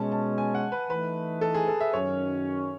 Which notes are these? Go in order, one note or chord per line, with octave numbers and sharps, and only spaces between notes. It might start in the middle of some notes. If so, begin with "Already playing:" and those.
Already playing: B2 G#3 C#4 A5
A5
G#5
F#5
B4
E3 A3 D#4 B4
A4
G#4
A4
E5
F#2 D#3 F#3 C#4 C#5